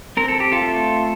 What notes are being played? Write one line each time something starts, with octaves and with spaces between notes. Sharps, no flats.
C4 A#4
A4
G4
F4 A4
A3